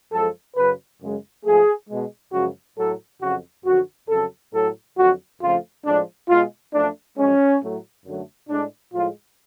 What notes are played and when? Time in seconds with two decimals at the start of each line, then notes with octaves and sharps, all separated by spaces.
0.12 F#2 F3 G#3 A4
0.57 F#2 C#3 F#3 B4
1.01 F#2 C#3 G#3
1.45 G#2 F3 A3 G#4
1.89 B2 G#3
2.33 F#2 C#3 F3 G#3 F#4
2.78 A2 F#3 A3 A4
3.21 F2 C#3 F#3 F#4
3.65 F#2 D3 F3 F#4
4.09 F2 C#3 F#3 A4
4.53 A2 F#3 A3 A4
4.97 F2 D3 F#3 F#4
5.41 F2 C#3 F3 A3 F4
5.85 A2 F3 G#3 D4
6.29 B2 G#3 F4
6.73 F#2 F3 A3 D4
7.17 F#2 F3 G#3 C#4
7.61 A2 F#3 A3
8.05 F#2 D3 F#3 A3
8.49 A2 G#3 D4
8.94 A2 F3 G#3 F4